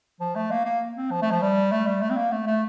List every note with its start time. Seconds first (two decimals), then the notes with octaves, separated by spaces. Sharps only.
0.21 F3
0.36 A3
0.51 A#3
0.65 A#3
0.97 C4
1.11 F3
1.22 A3
1.31 F3
1.42 G3
1.72 A3
1.87 G3
2.02 A3
2.10 C4
2.17 A#3
2.32 A3
2.47 A3